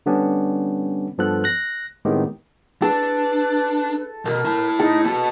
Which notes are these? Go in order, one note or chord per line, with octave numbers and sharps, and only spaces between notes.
D3 G3 B3 C#4 D4 G4
G2 F3 B3 A4 F#6
F#6 A#6
A2 D#3 G#3 B3 C4 G4
D4 A4 B4
B1 B2 A#4
E4 A5
D#4 A4
B3 F#4 A5